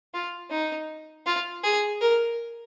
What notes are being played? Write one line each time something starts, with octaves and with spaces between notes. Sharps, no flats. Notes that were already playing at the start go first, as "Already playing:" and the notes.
F4
D#4
F4
G#4
A#4